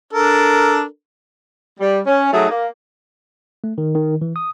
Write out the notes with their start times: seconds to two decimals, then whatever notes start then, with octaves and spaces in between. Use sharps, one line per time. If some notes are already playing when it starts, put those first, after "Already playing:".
0.13 D4 A4 A#4
1.79 G3
2.06 C#4
2.32 F#3 A3 D#4 G#4
2.49 A#3
3.64 A3
3.78 D#3
3.95 D#3
4.21 E3
4.36 D#6